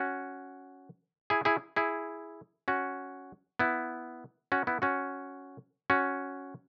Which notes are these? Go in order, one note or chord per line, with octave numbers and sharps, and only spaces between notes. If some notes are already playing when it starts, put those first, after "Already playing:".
Already playing: C#4 F#4
E4 G#4
E4 G#4
E4 G#4
C#4 F#4
B3 E4
C#4 F#4
B3 E4
C#4 F#4
C#4 F#4